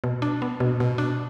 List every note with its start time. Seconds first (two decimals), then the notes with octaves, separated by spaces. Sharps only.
0.04 B2
0.22 D4
0.42 B3
0.60 B2
0.80 B2
0.98 D4